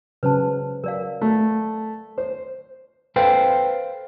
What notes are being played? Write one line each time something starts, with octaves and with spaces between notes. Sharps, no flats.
C#3 F#3 C#4 B4 C5 A5
F#3 A#4 D5 F5
A3
C5
A4 B4 C5 F5 G5